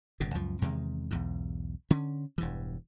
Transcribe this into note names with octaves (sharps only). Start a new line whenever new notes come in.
G1 A#2 C#3
C#2 F#2 F3
E2 C3 D#3 G#3
B1 E2 G#2
D3 C#4
E1 G2 E3